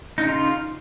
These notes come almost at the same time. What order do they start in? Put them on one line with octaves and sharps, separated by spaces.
D#4 C#3 F4